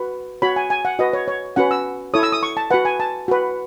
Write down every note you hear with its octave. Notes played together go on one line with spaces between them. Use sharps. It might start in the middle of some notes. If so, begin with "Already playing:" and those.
Already playing: F#4 B4
F#4 C#5 B5
G#5
G#5
F#5
F#4 B4 D#5
C#5
C#5
C#4 F#4 B4 F#5
E6
E4 A4 C#5 D#6
E6
D#6
C#6
A5
F#4 B4 F#5
G#5
A5
F#4 B4